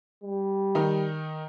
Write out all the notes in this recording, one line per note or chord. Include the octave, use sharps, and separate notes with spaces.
G3
D#3 D#4